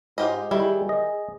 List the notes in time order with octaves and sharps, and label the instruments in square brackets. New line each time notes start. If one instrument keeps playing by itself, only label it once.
[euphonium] G#2 [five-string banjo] F4 G4 D#5
[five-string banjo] D#3 E4 [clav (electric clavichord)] G3 [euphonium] G#4
[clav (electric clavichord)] D#5